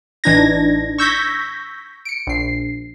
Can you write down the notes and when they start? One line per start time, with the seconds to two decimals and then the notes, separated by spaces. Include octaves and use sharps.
0.24 A1 E3 D4 D#4 G#6 A#6
0.98 C#6 E6 G6 G#6 A#6 B6
2.05 C#7 D7
2.27 A#1 C7